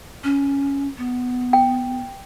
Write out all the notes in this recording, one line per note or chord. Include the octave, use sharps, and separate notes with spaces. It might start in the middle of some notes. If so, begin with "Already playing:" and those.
C#4
B3
G5